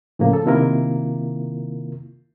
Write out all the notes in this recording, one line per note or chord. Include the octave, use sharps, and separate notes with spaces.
A2 C#3 F3 A#3
A4
C3 D#3 A#3 E4 F4 A#4